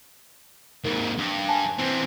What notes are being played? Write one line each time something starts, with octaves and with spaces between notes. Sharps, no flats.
D#2 G#2 A#4
G2
G#5 A5
E3 C4